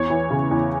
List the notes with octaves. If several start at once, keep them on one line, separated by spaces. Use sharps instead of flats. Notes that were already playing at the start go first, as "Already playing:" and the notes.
Already playing: E2 C#5
E3
C#3
E2